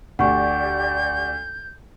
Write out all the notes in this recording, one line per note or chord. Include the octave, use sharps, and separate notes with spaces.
D2 G4 D5 F#5 C#6 G6